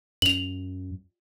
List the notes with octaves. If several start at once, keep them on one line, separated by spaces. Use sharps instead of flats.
F#2 F7 F#7